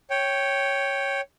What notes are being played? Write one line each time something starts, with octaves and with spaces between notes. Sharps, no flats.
C#5 G5